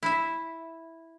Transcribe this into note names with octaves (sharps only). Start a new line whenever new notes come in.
E4 E5